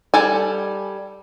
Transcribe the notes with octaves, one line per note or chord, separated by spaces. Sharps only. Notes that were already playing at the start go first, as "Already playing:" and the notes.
G3 A4 G#5